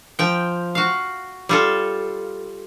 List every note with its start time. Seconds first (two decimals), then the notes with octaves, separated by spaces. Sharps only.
0.19 F3 G5
0.75 F#4 F5
1.49 G3 F4 A4